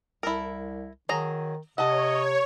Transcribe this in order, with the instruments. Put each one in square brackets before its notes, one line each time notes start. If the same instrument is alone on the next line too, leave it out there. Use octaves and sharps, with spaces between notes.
[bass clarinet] C2 [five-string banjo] E4 A4 A#4
[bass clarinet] D#3 [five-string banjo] F#3 G#4 A#5
[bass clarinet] C3 [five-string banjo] A4 F#5 [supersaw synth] C#5 [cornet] D#5